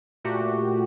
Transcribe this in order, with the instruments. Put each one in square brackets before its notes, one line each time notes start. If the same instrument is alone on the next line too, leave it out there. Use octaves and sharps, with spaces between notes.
[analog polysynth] A#2 A3 F#4 G4